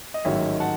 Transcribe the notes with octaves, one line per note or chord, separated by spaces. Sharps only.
D#5
A1 G#2 D#3 F#3 C#5 E5
F#5 A5